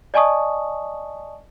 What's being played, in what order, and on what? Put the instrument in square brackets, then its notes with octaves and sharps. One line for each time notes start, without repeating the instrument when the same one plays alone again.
[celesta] D5 D#5 G#5 A5 C#6 D#6